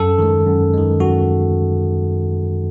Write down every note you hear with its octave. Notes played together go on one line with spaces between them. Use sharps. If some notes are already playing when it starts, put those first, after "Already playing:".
Already playing: F#2 A4
D#3 G#3
F#2
D#3 G#3
F#2 F#4